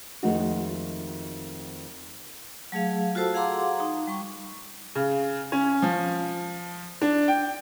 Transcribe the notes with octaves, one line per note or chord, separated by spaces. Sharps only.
F2 D#3 G#3 A3 D#4 F#4
F#3 A3 G#4 F5
F4 F#4 A4 C5 A5 E6
G#4 F5 F#5 A#5 C6 D6
D#4
G3 G5 C#6
C#3
C#4
F3
D4
G5